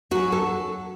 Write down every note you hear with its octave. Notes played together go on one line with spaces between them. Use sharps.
F#3 C#4 F#4
A4